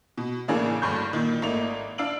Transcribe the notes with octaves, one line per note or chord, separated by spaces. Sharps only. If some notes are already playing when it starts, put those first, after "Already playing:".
B2
A2 C#3 E3 A#3 D4 G#4
D2 G2 C#6 G6
A#2 D#3
G#1 A3 A#3 D#4 F7
D4 F5 E6 D7 F#7